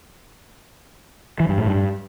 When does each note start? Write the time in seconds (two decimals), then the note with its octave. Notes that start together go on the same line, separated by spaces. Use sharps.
1.40 E3
1.49 G2
1.58 A2
1.67 G2